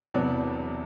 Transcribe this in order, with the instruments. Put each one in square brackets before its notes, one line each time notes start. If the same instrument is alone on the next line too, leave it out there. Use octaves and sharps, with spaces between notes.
[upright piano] E1 E2 C3 F#3 B3 D5